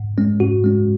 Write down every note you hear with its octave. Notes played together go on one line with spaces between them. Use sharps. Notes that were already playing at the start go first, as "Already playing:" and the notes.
Already playing: G#2
G#3 C#4
G#2 F#4
G#3 C#4